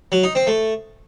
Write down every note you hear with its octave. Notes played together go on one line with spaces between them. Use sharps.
F#3
D#4
C4
A3